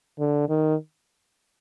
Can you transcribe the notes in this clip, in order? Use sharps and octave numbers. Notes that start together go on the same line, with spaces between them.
D3
D#3